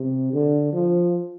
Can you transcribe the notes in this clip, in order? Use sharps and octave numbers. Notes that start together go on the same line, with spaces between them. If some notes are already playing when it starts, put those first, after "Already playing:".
Already playing: C3
D3
F3